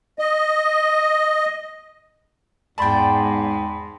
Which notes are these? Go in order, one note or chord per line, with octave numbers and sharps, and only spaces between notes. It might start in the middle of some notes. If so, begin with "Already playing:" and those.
D#5
E2 G#2 D5 G5 A5 B5 C6